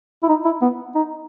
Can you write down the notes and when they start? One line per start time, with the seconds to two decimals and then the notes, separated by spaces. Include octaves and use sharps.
0.23 E4
0.29 D#4
0.45 E4
0.62 B3
0.95 D#4